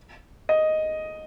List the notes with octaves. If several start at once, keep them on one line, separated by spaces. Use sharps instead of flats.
D#5